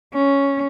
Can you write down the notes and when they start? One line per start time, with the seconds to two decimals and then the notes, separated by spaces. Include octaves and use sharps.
0.14 C#4